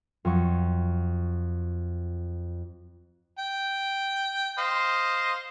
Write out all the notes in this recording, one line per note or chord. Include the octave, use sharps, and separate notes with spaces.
F2 F#3 C#6
G5
C5 D#5 F5